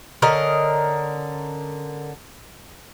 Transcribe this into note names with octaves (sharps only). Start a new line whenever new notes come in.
D3 C#4 A#4 D#5